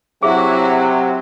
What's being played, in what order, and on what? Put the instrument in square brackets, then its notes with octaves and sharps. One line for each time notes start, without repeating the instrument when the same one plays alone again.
[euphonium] C3 [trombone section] F#3 [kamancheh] E4 F#4 [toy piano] G#4 E5